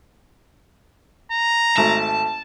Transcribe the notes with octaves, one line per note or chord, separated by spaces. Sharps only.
A#5
G#1 A3 A5